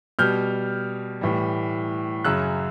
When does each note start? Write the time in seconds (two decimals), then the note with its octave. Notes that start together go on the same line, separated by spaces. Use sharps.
0.19 B2 G3 F6 G6
1.21 A2 E3 G3
2.25 F#2 C#3 F#3 E6 F#6